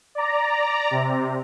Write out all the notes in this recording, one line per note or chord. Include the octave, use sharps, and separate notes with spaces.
D5 A#5
C3